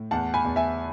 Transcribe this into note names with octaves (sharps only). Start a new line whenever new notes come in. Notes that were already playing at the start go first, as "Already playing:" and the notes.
Already playing: A2
E2 F#5 A5
G#5 B5
E2
E5 G#5